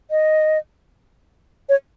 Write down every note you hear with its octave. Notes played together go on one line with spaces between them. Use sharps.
D#5
C#5